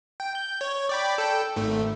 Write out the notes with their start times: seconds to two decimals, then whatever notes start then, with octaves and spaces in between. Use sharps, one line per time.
0.20 G5
0.35 G6
0.61 C#5
0.89 D5 G5 B5
1.18 A4 G5
1.56 G#1 A3